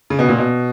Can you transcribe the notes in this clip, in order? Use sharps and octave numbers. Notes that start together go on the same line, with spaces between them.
C#3
B2
A#2
B2